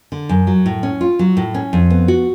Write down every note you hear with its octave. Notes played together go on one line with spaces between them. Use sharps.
D3
F#2
F#3
A2
C#4
F4
F#3
A2
C#4
F2
B3
F#4